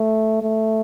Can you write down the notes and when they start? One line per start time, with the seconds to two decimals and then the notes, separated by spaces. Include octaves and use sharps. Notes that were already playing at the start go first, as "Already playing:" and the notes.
Already playing: A3
0.42 A3